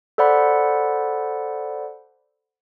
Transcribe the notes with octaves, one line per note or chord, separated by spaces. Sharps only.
A4 C5 D5 F#5 B5